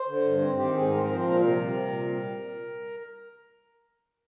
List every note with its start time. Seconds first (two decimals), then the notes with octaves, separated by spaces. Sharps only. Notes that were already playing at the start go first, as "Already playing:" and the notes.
Already playing: C5
0.08 D3
0.24 G2
0.41 C4
0.57 D#3 G4
0.74 G#2 G#4
0.90 C4 A#4
0.97 C5
1.03 F3 A#4
1.15 C5
1.23 A#2 A#4
1.40 C3 A#4
1.56 G3
1.73 C3
1.89 A#2
2.06 G3